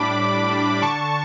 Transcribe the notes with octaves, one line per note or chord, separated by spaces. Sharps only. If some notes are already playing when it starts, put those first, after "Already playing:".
Already playing: A2 G3 D4 B5 D6
A2
G3 D4
B5
D3 A5 C#6